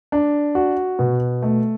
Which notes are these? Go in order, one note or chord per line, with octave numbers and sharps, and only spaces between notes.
D4
F#4
B2
A3